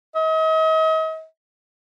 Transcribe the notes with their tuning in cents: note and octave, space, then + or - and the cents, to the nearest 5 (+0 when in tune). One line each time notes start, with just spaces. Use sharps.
D#5 +40